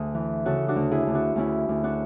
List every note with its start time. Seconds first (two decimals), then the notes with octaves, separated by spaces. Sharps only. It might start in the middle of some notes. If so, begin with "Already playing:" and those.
Already playing: D2 G#4
0.14 E3
0.45 C#3 F#4 A4
0.68 D4 F#4
0.76 D2
0.91 E4 G#4
1.07 D2
1.14 D4 F#4
1.36 D2 C#4 E4
1.69 D2
1.84 D4 F#4